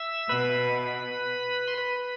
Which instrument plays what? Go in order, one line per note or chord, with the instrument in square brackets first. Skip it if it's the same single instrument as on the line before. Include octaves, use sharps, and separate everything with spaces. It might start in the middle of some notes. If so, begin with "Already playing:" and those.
Already playing: [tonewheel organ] E5 E6
[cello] B2 [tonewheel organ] B4 B5
[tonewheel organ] C6
B4 B5